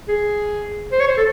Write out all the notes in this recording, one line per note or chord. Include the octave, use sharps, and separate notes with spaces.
G#4
C5
C#5
C5
A4